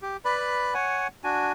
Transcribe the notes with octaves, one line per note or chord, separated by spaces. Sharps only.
G4
B4 D5 B5
C#5 F#5 G#5
D4 F#4 G#5